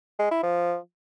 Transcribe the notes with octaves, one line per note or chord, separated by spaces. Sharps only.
G#3
E4
F3